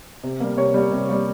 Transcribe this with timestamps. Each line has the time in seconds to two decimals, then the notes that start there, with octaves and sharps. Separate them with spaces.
0.24 C3
0.40 G3 A#3
0.57 C3 C#5
0.74 G3 A#3
0.92 C3
1.09 G3 A#3